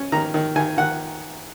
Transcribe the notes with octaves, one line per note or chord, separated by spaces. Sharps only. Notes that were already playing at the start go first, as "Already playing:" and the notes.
Already playing: C#4
D#3 A#5
D#3
D#3 G#5
D#3 F#5